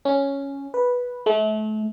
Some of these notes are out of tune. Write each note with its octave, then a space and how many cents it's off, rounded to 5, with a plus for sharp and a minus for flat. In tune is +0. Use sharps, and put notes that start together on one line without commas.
C#4 +0
B4 -10
A3 -35